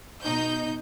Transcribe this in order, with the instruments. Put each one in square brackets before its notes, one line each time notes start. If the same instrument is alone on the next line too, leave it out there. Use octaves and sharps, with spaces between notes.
[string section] B2 D#4 G6